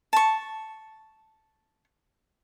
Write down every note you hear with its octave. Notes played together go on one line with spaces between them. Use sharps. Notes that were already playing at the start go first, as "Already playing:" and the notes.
A5 C#6